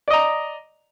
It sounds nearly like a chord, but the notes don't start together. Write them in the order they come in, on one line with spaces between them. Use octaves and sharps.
D5 D#5 A#5